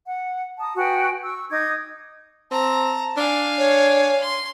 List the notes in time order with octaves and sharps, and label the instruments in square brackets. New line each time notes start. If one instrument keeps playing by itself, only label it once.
[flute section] F#5
A5 A#5 D#6
F#4 B4 G5 G#5
C#6 E6
D#4 D6 D#6 G#6
[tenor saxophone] C4 [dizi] A5 [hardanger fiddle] A#5
[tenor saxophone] D4 [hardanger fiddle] F5 G#5
[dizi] C#5
[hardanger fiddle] C6